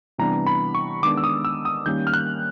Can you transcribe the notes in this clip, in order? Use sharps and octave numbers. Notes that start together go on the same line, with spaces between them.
C3 E3 G3 B3 D4 A#5
B5
C#6
D#3 G#3 B3 D4 D6
E6
D#6
E6
D#6
D#3 G3 A#3 C#4 G6
F6
F#6